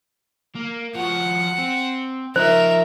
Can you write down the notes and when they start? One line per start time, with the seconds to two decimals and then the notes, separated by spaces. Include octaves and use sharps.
0.55 A#3
0.95 F3 F#4 F#5
1.59 C4
2.36 F3 D#4 A#4 C5 E5